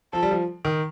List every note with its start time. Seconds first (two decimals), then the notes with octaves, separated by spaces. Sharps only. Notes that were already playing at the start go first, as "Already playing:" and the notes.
0.13 F3 A4
0.23 G3
0.31 F3
0.65 D#3